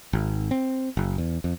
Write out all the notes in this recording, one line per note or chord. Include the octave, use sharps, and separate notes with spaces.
G#1
C4
F#1
E2
F2